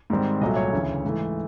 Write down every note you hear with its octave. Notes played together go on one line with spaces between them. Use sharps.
G#2 D#3 G3 C4
C2 A#2 F#3 A3 D#5
C#5
D2 C#3 E3
G#2 E3 A3